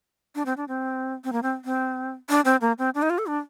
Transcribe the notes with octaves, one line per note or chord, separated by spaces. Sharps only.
D4
C4
D4
C4
C4
A#3
C4
C4
D4
C4
A#3
C4
D4
D#4
F4
A4
D4